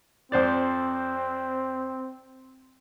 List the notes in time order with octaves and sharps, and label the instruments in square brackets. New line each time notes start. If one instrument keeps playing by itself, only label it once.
[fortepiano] F2 C5 D5 [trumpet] C4